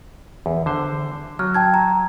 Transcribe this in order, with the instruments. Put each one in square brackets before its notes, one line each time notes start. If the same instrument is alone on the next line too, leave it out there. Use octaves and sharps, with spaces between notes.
[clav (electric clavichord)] E2
D3 C5
[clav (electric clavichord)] F#3 [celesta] F6
[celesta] G5 A5 G#6
A#5